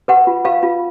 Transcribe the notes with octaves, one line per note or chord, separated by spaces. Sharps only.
B4 F#5
F4
B4 F5
F4